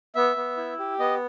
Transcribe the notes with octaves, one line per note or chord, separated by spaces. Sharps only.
B3 E5
B3
E4
G4
B3 D#5